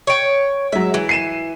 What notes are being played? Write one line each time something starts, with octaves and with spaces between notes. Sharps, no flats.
C#5 G5
F#3 G#3 E5
E3
C7 D#7 E7